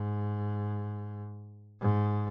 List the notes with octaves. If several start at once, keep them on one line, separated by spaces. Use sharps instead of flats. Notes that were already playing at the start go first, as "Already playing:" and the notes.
Already playing: G#2
G#2